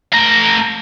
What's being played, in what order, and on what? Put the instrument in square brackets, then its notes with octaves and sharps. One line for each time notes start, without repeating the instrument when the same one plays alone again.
[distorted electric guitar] A3 A#5